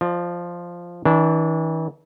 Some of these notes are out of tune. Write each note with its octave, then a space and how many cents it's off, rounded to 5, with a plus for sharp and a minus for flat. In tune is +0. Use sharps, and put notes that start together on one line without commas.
F3 +0 D5 +40
E3 -40 D4 -20